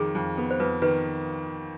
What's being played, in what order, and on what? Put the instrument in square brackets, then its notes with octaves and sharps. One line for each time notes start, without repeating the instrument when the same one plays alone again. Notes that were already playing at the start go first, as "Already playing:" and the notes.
Already playing: [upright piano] F2 D#3 [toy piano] G#4
[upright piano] F2
B3
[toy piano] C5
[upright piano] F2 [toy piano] B4
[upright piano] D#3 [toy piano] B4